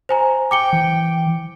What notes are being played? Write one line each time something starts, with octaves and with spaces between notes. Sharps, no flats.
C5 G#5 A#5
G5 D6 C#7 G7
E3